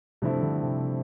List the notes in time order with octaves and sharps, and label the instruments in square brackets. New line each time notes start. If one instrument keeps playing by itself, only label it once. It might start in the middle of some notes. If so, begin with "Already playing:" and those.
[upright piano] G2 F3 A3 C4 E4 [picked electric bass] C3
[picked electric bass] D3
C3